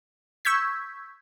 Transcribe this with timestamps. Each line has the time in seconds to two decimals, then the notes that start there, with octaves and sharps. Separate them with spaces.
0.45 C#6 E6 G6 G#6 B6